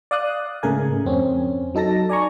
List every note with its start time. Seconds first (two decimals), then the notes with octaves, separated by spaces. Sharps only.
0.11 D5 F5 D#6 F#6
0.63 G#2 C#3 A3 A#4 G#5
1.05 F2 C4 C#4
1.75 F#3 D#4 A4 A5 A#6
2.09 D5 G#5 A#5 C#6